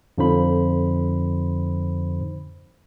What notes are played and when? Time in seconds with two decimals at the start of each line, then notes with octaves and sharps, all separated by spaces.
0.18 F2 D3 F3 D#4 C5 B5